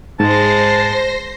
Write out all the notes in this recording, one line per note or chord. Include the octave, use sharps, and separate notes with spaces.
G#2 G#3 C5 A5 A#6 C7